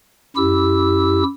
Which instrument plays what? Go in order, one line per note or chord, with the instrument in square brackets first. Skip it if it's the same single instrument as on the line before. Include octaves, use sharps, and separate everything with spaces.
[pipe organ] F#2 E4 G4 E6